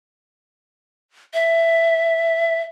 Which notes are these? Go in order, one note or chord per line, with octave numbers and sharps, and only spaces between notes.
E5